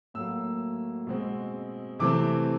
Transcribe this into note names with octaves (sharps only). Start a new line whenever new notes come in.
A2 F#3 A#3 E6
B2 G#3 C4
C3 E3 A3 C4 D6